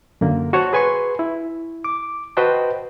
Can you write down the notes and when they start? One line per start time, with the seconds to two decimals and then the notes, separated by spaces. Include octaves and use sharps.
0.21 F#2 D3 A#3
0.53 F#4 C5 C#5 A5
0.73 G#4 B4 G#5 C6 C#6
1.19 E4
1.84 D6
2.37 F#4 B4 C5 D#5 G5 A5